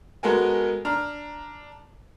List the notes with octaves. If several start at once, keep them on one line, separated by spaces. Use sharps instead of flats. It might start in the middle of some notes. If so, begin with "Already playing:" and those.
G#3 B3 F#4 A4 A#4 G#5
D4 A#5 F6